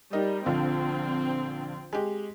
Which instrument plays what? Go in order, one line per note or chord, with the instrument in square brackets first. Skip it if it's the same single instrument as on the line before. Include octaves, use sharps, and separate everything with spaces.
[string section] G3 [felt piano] D#4 A#4 D#5
[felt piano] A#1 D3 F4 [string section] C4
[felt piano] G#3 G4